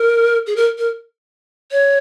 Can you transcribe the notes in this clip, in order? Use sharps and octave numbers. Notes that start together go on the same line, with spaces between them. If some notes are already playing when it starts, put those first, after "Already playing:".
Already playing: A#4
G#4
A#4
A#4
C#5